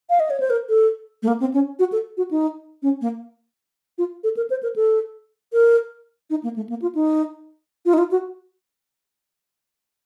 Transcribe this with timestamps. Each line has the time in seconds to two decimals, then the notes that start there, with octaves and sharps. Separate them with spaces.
0.10 F5
0.20 D#5
0.30 C#5
0.40 C5
0.50 A#4
0.69 A4
1.23 A3
1.28 A#3
1.40 C4
1.54 C#4
1.79 F#4
1.92 A4
2.17 F#4
2.31 D#4
2.83 C#4
3.01 A#3
3.98 F4
4.24 A4
4.37 A#4
4.50 C5
4.63 A#4
4.76 A4
5.53 A#4
6.30 D#4
6.43 A#3
6.56 A3
6.69 A#3
6.82 F4
6.95 D#4
7.85 F4
7.94 D#4
7.98 F4
8.11 F#4